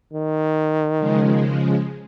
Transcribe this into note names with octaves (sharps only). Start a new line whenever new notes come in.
D#3
C#3 F3 G#3